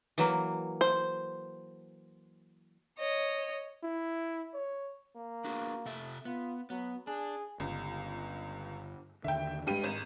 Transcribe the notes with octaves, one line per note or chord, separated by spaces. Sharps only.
E3 F#3 A#3
C5
C#5 D#5
E4
C#5
A#3
D4 F#4 G#4
C3 A4 E5
B3 F4
F#3 B3
D4 G#4
G1 C#2
D#2 D3 E5 G5
G2 G#3 D4 G4 D#7
G#1 E7